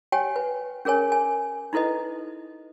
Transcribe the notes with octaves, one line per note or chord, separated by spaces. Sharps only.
G4 C#5 G5 G#5
B4
C#4 G#4 A#4 C#5 G#5
G#5
D#4 E4 A4 B4 D#5